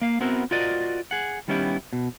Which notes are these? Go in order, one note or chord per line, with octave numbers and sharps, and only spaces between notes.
A#3 F5
B3 C4 E4 F#4 A#4
F4 F#4 A#4 C5 D5 D#5
G#4 F#5
D#3 G3 B3 C#4 E4 G4
B2